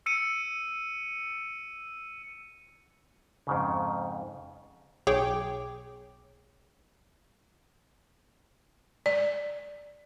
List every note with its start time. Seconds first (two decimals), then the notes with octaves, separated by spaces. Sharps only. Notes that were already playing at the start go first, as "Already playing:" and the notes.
0.06 E6 C#7 D#7
3.47 F2 G#2 C#3
5.07 B1 G#4 C#5 G5 D6
9.06 D5